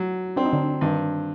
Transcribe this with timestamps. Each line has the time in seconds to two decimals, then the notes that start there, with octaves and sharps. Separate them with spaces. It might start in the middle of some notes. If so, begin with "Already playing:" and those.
Already playing: F#3
0.36 C4 D4
0.45 D#4
0.53 D3 D4
0.81 G2 D#3 D#4